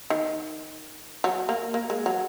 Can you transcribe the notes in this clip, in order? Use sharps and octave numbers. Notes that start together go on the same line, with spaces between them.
D#3
F#3
A#3
A#3
G#3
F#3